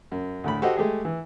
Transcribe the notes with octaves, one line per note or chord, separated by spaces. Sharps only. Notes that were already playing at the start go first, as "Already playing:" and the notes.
F#2
D2 A2 B5
F#4 G4 A4 C5 D#5 F#5
G#3 A3 G4 G#4
E3